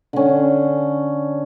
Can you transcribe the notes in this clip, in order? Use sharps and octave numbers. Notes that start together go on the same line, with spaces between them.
D3 C#4